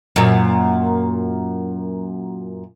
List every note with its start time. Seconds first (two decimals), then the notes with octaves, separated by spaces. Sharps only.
0.16 F#2 A#2